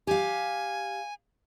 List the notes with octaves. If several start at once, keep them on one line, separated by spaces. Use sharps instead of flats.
G4 F5 G#5